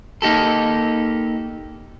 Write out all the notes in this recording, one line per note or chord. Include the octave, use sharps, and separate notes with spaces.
A#3 D#4 G4 A4